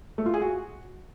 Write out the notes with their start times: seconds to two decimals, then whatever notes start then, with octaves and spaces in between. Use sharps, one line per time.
0.18 A3
0.26 F4
0.34 G#4
0.41 F#4